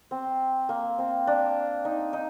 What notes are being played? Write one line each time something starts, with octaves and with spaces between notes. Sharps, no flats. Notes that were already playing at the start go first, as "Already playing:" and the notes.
C4
A#3
C4
D4
D#4
D#4